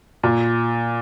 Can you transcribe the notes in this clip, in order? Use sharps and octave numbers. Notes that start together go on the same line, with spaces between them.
A#2